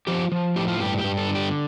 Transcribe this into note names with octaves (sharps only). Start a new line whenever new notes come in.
F3 G4
F3
A2 G4
F4
G2 G4
G4
G2
A4
D3
G4